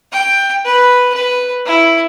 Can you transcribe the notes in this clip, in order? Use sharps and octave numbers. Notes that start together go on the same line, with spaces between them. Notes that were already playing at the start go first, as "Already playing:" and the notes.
G5
B4
B4
E4